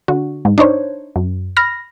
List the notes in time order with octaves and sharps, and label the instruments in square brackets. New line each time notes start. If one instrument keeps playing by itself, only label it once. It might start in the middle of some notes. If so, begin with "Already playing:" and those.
[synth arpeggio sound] D3 F#4
G#2
D4 D#4 C5 C#5
F#2
B5 F6 A#6